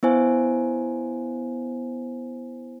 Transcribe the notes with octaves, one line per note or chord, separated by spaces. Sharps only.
B3 E4 C5 G#5